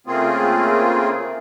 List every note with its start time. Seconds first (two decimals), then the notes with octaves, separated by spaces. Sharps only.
0.07 C#3 A3 A#3 C4 F4 G#4